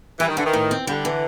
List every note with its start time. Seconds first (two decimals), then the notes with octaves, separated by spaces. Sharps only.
0.19 E3 G3
0.28 D#3
0.37 D3 E3
0.45 D#3
0.53 A2
0.71 C4
0.87 D3 G3
1.05 E3